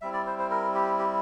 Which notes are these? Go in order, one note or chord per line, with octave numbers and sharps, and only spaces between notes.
G3 C4 E4 E5
D5
C5
C5
A#4
G4
G4